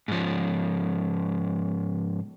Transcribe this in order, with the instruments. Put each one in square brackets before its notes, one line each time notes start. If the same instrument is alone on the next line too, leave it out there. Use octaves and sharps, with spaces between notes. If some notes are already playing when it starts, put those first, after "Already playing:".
[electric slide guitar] G#2 F3